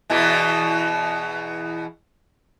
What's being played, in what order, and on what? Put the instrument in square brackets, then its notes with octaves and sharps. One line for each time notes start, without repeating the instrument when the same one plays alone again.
[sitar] E2 B2 E3